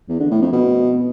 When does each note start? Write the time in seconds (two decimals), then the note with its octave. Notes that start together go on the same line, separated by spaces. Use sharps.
0.09 E2
0.20 D3
0.31 A2
0.42 F2
0.52 B2